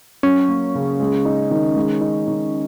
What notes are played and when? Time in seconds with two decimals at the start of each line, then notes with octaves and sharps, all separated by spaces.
0.23 F#3 C#4
0.49 A#3
0.75 C#3
1.00 G#3
1.25 D#4
1.51 D#3
1.76 G#3
2.01 D#4
2.28 D#3